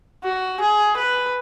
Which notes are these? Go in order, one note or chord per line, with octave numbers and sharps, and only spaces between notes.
F#4
G#4
B4